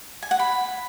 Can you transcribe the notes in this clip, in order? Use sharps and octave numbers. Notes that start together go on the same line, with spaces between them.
G#5
F#5
B5